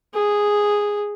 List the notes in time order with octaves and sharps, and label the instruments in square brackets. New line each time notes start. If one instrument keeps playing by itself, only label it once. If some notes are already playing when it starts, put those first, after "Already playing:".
[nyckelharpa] G#4